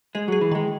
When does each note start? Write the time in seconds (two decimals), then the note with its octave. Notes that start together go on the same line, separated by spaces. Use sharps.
0.15 G#3 G#4
0.28 F#3 G#4
0.41 E3
0.52 D#3 G#3